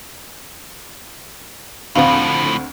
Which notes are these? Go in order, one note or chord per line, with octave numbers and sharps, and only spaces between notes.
D2 A2 F3 C4 F5 F#5 B5